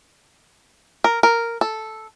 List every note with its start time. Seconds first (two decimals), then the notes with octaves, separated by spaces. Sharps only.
1.04 A#4
1.23 A#4
1.61 A4